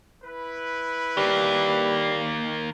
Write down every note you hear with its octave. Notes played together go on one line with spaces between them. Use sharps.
E4 B4
D#3 G3 A#3